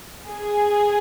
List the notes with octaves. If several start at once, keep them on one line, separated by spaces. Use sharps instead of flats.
G#4